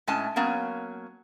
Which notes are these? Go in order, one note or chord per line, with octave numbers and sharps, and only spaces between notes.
A2 G#3 C#4 G#5 A5
F#3 A#3 B3 C#4